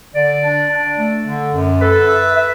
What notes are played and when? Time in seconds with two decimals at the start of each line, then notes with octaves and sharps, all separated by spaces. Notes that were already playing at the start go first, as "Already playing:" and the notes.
0.14 D3 D5
0.43 D4
0.70 D4
0.98 A3
1.25 D3
1.53 F#2
1.81 A4 B4
2.08 E5
2.36 E5